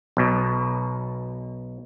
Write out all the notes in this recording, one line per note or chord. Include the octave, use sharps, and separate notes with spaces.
B1 B2